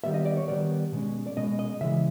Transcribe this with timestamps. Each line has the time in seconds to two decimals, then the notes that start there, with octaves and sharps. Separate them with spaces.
0.04 D#3 G3 B3 E5
0.14 D#5
0.25 D5
0.37 C#5
0.48 D#3 G3 B3 D5
0.92 B2 G#3 C#4
1.27 D5
1.36 B2 G#3 C#4 D#5
1.59 D#5
1.81 C#3 E3 G#3 E5